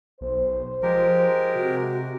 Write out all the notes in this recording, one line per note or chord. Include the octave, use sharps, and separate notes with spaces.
B1 C5
F3 G#3 G4 A#4
C3 F#4